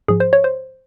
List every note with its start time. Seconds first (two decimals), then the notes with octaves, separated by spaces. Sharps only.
0.08 G#2 F3 G#4
0.20 C5
0.33 C#5
0.44 C5